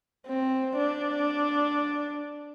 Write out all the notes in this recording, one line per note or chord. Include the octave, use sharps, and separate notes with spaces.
C4
D4